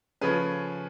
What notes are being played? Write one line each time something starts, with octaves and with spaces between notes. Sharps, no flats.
C#3 F3 A3 C#4 G#4 B4